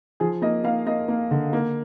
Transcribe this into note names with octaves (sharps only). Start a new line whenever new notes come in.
F3 G#4
A#3 D#5
A#3 F5
A#3 D#5
A#3
D3
A#3